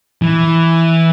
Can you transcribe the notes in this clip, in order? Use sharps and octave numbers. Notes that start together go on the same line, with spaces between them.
E3